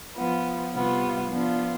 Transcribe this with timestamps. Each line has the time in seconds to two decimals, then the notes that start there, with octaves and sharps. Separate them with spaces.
0.16 F3 B3 F4
0.73 C3 G3 B3 F4
1.30 F3 B3 D4 F4